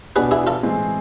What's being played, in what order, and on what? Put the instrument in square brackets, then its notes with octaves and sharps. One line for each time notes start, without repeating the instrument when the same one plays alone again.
[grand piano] B2 B3 D4 [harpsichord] G#4 B4
[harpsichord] E4 G#4
F4 A4
[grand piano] A2 E3 G#3 C4 G#4